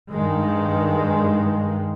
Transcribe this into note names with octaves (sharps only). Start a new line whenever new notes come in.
G2 D#3 G#3